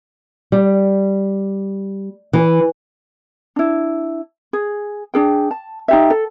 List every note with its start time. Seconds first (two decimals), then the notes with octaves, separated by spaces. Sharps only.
0.52 G3
2.33 E3
3.56 D4 E4
4.53 G#4
5.14 D4 G#4 G5
5.51 A5
5.88 D#4 G4 E5
6.10 A4